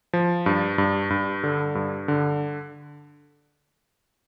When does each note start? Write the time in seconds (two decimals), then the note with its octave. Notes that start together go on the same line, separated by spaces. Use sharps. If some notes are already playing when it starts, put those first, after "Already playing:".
0.13 F3
0.46 G2
0.78 G2
1.10 G2
1.44 D3
1.75 G2
2.08 D3